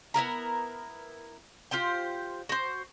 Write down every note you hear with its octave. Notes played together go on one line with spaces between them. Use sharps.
B3 E4 A#4 A#5
F4 G4 C5 G5
F#4 C5